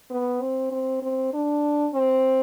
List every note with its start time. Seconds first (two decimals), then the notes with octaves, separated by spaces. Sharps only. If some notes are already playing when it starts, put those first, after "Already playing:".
0.10 B3
0.41 C4
0.71 C4
1.02 C4
1.33 D4
1.95 C4